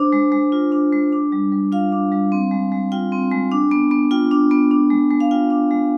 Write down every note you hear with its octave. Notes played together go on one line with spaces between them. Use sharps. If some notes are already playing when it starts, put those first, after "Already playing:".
Already playing: D4 C5
G#3
G#3
F4
D4
G#3
D4
G3
G3
F4 F5
D4
G3
C4
G#3
G#3
F4 G5
C4
G#3
D4
B3
B3
F4 G5
D4
B3
D4
G#3
G#3
F5
F4 G5
D4
G#3